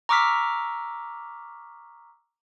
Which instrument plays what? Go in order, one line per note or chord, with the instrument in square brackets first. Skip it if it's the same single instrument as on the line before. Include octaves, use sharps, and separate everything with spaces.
[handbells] A#5 C#6 D6 E6 F6 B6